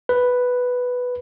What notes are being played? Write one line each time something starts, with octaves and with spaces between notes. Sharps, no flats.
B4